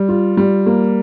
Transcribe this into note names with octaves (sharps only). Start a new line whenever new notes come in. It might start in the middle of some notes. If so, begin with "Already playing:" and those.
Already playing: G3
F4
G3
A#3